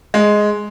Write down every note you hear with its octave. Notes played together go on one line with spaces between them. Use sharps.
G#3